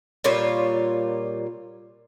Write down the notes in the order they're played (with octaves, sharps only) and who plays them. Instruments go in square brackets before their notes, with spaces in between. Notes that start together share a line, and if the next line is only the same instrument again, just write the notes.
[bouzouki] A#2 G3 F4 C#5